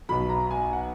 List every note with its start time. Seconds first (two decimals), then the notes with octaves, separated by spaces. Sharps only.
0.09 B1 B2 F#3 B5
0.29 A#5
0.51 G#5
0.73 F#5